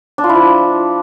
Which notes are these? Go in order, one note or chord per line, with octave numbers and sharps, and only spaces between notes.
D4
F4
E4
F3